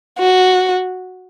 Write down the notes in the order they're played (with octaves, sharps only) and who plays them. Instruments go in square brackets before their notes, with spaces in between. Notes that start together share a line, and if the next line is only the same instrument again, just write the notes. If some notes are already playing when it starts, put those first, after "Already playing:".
[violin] F#4